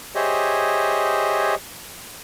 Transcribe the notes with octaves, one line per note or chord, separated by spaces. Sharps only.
G4 G#4 C5 C#5 D#5 E5